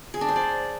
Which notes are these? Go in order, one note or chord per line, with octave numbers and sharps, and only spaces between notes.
G#4
D4
C5
D5